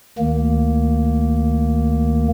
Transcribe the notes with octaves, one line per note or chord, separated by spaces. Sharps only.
D2 D#3 A#3